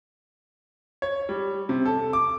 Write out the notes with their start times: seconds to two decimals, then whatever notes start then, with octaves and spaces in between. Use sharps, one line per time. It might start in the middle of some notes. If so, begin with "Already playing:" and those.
1.02 C#5
1.29 G3
1.69 C3
1.85 A4
2.13 D6